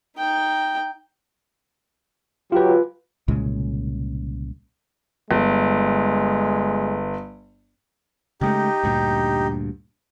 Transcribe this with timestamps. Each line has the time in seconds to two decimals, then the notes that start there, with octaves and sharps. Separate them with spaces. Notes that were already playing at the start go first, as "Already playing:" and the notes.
0.18 D#4 G5
2.52 F#3 F4 G4 B4
3.28 C2 A#2 C#3 G#3
5.31 G1 G#3
8.41 C#3 G#3 A3 D#4 G4
8.84 D2 G2 A#2